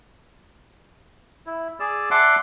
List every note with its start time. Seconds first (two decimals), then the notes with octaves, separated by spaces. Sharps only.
1.46 E4
1.80 G#4 D5 E6
2.11 D5 E5 F#5 A5 C6 D6